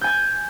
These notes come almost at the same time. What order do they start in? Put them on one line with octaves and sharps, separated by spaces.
G6 G#5 G#6